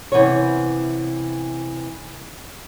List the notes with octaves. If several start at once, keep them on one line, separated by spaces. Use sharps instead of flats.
C3 E3 B3 C#4 C#5